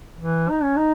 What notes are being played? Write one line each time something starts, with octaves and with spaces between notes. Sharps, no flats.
E3
D#4
C#4
D#4